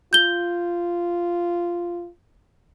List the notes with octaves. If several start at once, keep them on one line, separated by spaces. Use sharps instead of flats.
F4 G6 G7